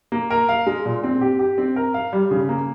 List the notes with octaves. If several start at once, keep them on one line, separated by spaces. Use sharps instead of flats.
A#3
A#4
F5
G#3
A#2
C4
G4
G4
C4
A#4
F5
G3
C#3
A#3